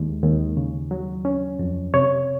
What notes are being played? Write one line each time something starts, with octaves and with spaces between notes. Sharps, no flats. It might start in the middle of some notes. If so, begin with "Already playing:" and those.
Already playing: D#2 G#3
D#2
C#3
F#3
C#4
F2
C3 C#5